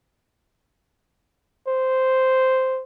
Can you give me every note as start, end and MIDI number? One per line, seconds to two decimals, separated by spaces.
1.68 2.83 72